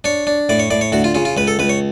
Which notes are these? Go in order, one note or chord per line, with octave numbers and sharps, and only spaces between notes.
D4 C#5
D4
A2 D5
C#5
A2 D5
C#5
D2 F#4
F4
C#3 F4
F4
C#2 B4
A4
C#2 B4
C#5